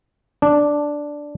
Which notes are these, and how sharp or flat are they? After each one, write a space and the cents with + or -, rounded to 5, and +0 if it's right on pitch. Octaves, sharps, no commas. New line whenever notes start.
D4 +0